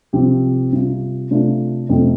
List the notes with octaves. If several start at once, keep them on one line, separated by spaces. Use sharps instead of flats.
C2 C3 F3 C4 G4
C3 G3 F4
C3 A3 D4 F4
F2 C3 A3 C4